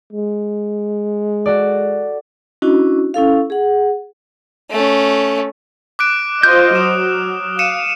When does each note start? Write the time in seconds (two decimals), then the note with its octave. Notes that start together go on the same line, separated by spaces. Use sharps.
0.13 G#3
1.46 F#4 A4 D5
2.62 C#4 D4 E4 F#4 D#5
3.14 C#4 E4 A4 F5
3.50 G#4 F#5
4.71 A3 C#4
5.99 D6 F#6 D7
6.43 F4 C5 D#5 F6 G6
6.75 F#3 D#6 E7
7.59 F5 C#7 D#7 E7